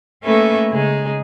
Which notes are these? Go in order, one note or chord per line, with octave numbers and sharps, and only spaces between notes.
A3 A#3 C#4 A4 B4 E5
C#3 G#3 D#4 G#4